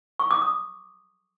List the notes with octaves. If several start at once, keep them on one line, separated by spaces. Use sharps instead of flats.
C#6
D6
D#6